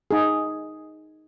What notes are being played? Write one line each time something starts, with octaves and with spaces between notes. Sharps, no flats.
D#4 G#4